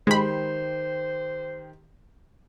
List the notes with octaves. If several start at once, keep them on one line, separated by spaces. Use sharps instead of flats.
D#3 G#3 G4 C5 B5 C6